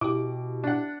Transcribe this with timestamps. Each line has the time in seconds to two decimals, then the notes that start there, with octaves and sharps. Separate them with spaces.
0.01 B2 E4 G4 D6
0.64 D4 F#5